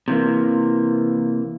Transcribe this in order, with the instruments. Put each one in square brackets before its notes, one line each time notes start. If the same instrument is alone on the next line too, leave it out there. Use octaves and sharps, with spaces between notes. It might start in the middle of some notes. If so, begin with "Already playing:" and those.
[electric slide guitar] C3 E3 A#3